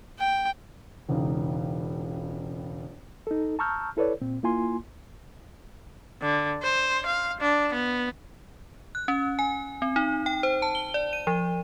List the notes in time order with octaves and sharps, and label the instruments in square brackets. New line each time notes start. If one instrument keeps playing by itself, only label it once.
[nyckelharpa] G5
[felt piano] E1 C#2 D#4
[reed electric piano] D#4 A4
A5 A#5 C#6 E6 F6 G6
E4 A4 B4 C#5 D5
A#2 C4
A#3 E4 F4 G#5 C6
[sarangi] D3
C5
F5
D4
B3
[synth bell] F#6
C#4
G#5
C4
D#4
G5
C5
A5
G7
D5
D#7
F3